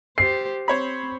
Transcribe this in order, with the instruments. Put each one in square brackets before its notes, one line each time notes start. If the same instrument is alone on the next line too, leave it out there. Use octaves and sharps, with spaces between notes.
[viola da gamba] G4 C5 [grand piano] C7
[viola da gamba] C4 [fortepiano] C5 C#5 B5